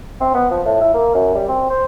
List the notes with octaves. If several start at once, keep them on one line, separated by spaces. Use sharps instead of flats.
C4
B3
F3
A2
E4
A#3
F#2
G3
C4
C5